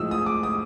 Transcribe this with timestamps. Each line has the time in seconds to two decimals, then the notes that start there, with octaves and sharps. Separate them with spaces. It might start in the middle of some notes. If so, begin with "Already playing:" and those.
Already playing: A2 F3 G#3 D#6 E6
0.11 D#6
0.26 D6
0.43 D#6